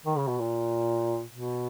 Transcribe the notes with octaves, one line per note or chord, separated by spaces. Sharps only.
D#3
C#3
B2
A#2
B2